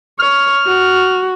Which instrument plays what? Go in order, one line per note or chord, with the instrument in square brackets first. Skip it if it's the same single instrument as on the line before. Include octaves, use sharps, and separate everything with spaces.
[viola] C#5 [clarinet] F6
[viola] F#4